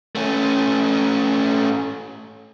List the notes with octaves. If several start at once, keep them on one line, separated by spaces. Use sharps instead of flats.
A3 C#4